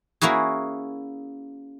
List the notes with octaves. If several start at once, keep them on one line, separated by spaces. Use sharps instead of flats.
A#3 C#4 E4 F#4 G#4